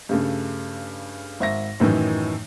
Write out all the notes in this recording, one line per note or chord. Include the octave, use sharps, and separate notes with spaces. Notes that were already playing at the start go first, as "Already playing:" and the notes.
G2 C#3 A3
G#1 E5 A#6
F#2 A2 D#3 E3 D#4